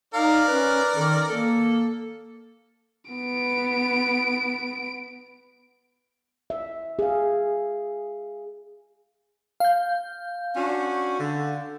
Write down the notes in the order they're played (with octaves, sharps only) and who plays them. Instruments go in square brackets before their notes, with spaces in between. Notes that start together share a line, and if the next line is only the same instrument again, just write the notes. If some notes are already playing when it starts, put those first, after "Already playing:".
[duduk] D#4 [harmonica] A#4 D5 [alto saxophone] F5
[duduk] C#4 [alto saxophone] B4
[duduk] D#3 [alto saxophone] A4
[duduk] A#3 [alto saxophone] A4
[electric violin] B3 D7
[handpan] E5
G#4 F5
[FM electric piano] F5 G6
[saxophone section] C#4 D4 F#4
D3